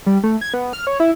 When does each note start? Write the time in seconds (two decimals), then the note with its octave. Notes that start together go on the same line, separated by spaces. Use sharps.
0.06 G3
0.23 A3
0.41 G#6
0.54 B3
0.73 F6
0.87 C#5
1.00 E4